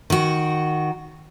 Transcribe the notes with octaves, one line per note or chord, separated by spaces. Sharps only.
D#3 F#4